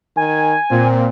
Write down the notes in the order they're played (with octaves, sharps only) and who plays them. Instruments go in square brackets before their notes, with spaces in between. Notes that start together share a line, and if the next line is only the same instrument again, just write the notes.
[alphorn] D#3 [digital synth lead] G#5
[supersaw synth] A#2 [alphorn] C4